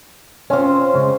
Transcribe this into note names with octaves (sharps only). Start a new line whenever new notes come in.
C4 C#4 F4 C5
C#3 G#3